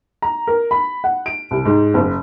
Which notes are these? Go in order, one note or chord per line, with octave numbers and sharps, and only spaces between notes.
A#5
A#4
B5
F#5
D7
C2
G#2
F#1